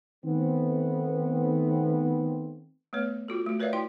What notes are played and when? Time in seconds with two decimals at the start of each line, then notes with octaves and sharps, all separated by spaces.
0.24 D#3 A3 B3 C4
2.93 A3 B3 B4 C#5
3.28 F4 F#4 A4
3.46 A3 F#4
3.60 A#4 B4 C#5 D5 E5 F5
3.73 E4 F#4 G5 C6